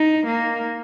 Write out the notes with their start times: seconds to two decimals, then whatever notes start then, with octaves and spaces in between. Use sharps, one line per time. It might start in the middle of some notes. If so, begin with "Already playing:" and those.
Already playing: D#4
0.26 A#3